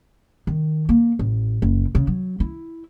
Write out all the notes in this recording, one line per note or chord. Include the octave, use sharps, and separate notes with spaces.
D#3
A#3
A1
F#1
C#3
F#3
E4